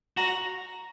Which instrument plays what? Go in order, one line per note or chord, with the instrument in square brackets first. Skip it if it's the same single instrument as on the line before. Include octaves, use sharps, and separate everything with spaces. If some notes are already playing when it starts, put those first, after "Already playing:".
[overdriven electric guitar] F#4 [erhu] A#5